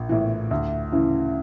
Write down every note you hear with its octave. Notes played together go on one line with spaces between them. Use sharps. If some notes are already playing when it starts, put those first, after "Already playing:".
Already playing: A#1
A2 E3
D2
C#3 E3